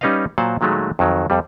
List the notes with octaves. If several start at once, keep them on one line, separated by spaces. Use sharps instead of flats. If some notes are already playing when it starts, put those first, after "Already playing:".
G3 C#4 D#4 B4 D#5 F5
A#2 F#3 C5 F#5 A5
A#2 D#3 F#3 G#3 A3
F2 D#3 F#3
F2 G3